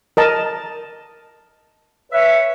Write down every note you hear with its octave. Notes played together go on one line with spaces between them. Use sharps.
A#4 D#5 A5
B4 C#5 E5